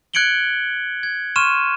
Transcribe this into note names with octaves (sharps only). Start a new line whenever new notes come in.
F#6 G#6 C#7 D7 F#7 G7
G#6
C6 C#6 F6 D#7 E7